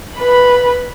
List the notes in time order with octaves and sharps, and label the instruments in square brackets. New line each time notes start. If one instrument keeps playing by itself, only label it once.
[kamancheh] B4 B5